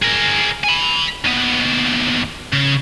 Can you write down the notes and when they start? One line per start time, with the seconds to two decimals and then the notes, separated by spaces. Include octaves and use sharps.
0.02 G#4 A#4
0.64 G#5 B5
1.25 D#2 B3
2.53 C#3